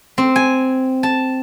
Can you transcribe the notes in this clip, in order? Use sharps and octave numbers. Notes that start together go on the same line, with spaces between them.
C4
G#5
A5